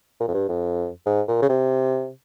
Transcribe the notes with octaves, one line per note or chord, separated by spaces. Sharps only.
A#2
F2
G2
F2
G#2
A#2
C#3
C3